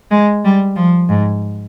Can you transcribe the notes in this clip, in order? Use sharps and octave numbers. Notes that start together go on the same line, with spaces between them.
G#3
G3
F3
G#2